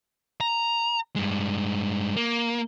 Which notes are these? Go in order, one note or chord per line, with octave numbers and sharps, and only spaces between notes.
A#5
G2 G#3
A#3